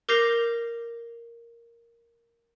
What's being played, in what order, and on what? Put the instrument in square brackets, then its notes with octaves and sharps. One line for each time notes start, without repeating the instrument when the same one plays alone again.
[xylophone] A#4 D6 G6 A#6 C7 F7